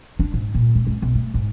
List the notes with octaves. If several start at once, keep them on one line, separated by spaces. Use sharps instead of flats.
D4
G#2
A#2
C#2
C#2
B1
A3
G#2